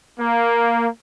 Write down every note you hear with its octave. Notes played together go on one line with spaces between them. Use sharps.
A#3